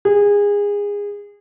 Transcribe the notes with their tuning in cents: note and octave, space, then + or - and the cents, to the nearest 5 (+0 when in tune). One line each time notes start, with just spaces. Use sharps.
G#4 -25